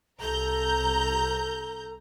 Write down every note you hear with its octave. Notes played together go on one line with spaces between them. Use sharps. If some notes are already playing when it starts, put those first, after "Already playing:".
C2 A4 A#5 G6